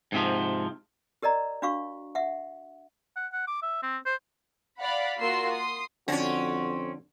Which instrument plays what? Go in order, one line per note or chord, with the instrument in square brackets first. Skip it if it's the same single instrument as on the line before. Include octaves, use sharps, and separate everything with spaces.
[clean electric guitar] G#2 C3 F3
[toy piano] G4 A#4 D5 D#5 A#5
D4 F#4 F5 C#6
E5 F#5
[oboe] F#5
F#5
D6
E5
C4
C5
[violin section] D5 F5 F#5 B5
A#3 F4 F#4 C6 E6 C7
C6 D#6
[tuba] F2 [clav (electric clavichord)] D3 [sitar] C4 C#4 [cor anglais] F#4